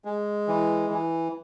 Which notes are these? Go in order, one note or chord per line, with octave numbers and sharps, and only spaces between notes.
G#3
E3
E3